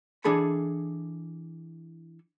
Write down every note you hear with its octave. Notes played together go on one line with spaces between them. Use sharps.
E3 D4 G#4 A4 B5